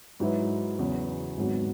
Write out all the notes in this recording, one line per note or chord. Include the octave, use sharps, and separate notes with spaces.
G#2 F#3 E4 B4
E2 C#3 F#3
G#1 G#2 F#3 B3 F#4